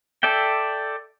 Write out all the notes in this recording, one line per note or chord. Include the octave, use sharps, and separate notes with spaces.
A4 D5 E5 G5